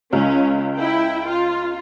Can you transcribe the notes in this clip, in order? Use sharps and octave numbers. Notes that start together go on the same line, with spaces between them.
C#2 C#4
E4 G5
F4